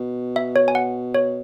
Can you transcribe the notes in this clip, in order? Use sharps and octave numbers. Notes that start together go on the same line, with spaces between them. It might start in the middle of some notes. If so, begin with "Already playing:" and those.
Already playing: B2
E5
C#5
G#5
F#5
C#5